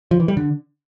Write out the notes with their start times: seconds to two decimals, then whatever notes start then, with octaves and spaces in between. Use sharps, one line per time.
0.11 F3
0.20 E3
0.28 G3
0.37 D3